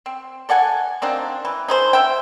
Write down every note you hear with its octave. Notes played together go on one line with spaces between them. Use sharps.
C4
A4 D5 F#5 G#5
A#3 C4 D4 D#4
E3
D#4 G#4 C5
E5 G5